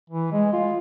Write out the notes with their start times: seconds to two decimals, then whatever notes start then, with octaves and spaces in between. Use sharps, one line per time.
0.10 E3
0.32 G#3
0.53 F4